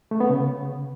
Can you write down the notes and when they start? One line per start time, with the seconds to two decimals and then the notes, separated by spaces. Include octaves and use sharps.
0.11 A3
0.20 B3
0.30 C#3